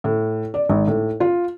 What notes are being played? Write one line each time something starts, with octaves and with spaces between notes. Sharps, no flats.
A2
D5
G#1
A2
F4